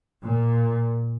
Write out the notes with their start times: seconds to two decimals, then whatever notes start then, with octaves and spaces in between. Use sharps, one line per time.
0.23 A#2